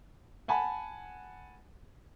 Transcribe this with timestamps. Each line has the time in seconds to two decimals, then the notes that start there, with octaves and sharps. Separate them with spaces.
0.48 F#5 G#5 A5 B5